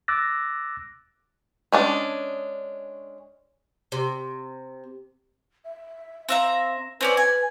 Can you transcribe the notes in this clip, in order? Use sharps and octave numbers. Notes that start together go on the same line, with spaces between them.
D6 E6 F#6 A6 A#6
G#3 C#4 D4
C3
E5
C4 E5 F5 A#5
C4 C#4 B4 D5
G#5